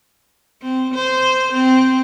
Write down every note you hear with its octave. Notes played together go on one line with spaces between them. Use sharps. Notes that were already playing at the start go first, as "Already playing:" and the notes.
C4
C5
C4